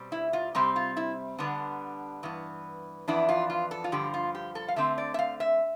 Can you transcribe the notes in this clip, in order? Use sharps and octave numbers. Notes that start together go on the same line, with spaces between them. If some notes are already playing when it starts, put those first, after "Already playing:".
Already playing: B2 G3 C4
E4
F4
C3 G3 C4 G4
F4
E4
D3 G3 B3 D4
G2 E3 B3
F2 E3 B3 D4 E4
F4
F4
A4
F4
G2 D3 F3 G4
F4
G4
A4
F5
D3 A3 C4 E5
D5
E5
F5
E5